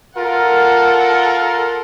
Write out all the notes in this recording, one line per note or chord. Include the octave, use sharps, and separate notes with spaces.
F4 A4 A#4 F#5